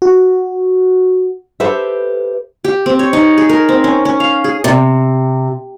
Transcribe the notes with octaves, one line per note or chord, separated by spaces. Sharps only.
F#4
G4 A4 B4 C5 E5
G4
C4
C#5
D#4
G#4
A#4
C4
C#4
C#4
F5
G#4
C3